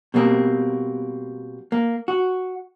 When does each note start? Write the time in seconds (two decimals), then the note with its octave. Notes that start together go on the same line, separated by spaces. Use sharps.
0.14 B2 G3 A#3 C4
1.72 A#3
2.08 F#4